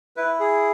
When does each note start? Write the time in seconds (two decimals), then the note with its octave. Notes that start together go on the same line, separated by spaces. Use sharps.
0.16 E4 B4
0.40 G#4